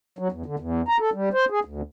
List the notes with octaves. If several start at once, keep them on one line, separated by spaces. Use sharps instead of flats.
F#3
E2
D3
E2
A#5
A4
G3
C5
G#4
D2